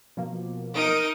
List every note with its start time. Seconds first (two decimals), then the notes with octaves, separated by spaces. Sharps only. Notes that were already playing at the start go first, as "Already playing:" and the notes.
0.17 B2 F3 A#3
0.75 D#4 A#4 D#6 D7